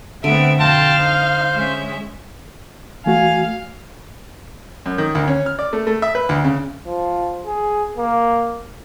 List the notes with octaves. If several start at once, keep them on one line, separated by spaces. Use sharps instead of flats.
D3 A3 B3 C4 E5 D7
F2 B2 F5 G5 A5 C6 A#6
D#4 C5
G#3 C#4 E5
E3 A3 F#4 F5 G#5
F#2
D#3
D2
C#4
F6
D5
A3
A3
E5
B4
D2
C#3
F3
G#4
A#3